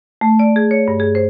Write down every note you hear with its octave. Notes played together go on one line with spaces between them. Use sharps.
A3
D5
G#4
C#5
G2
G#4
C5